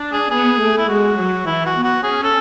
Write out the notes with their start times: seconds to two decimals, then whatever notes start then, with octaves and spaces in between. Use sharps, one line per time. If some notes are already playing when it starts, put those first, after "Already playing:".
Already playing: D4
0.12 G#4
0.31 B3 G#4
0.60 A3
0.78 E4
0.88 G#3 F#4
1.17 F#3
1.46 E3 E4
1.66 F#4
1.76 B3
1.84 F#4
2.04 C#4 G#4
2.23 A4